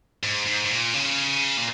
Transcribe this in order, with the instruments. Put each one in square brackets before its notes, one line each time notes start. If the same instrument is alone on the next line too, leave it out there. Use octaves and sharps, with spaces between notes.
[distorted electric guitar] G#2
G#2
G#2
A#2
C#3
A#2